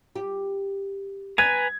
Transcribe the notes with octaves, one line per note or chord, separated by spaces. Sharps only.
G4
B3 B4 G#5 A#5 G#6